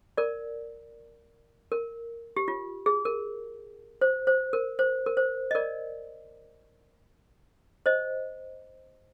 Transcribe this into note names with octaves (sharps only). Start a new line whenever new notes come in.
A#4 D5
A#4
G4
F4
G#4
A#4
C5
C5
A#4
C5
A#4
C5
D#5
A#4 D5
C5 D#5